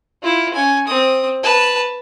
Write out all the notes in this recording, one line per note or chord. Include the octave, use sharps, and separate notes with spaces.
E4 F4
C#4 G#5
C4 D#6
B4 A5